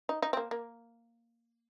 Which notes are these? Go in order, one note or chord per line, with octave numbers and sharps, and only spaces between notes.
D#4
D#4
C4
A#3
A#3